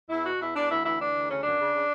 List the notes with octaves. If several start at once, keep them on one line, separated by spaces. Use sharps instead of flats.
E2 E4
B2 F#4
E2 E4
E2 D4
D2 E4
E3 E4
E3 D4
D2
C#3 C#4
F#2 D4
C#3
C#3